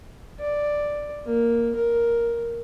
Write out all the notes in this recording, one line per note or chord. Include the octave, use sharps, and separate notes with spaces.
D5
A#3
A#4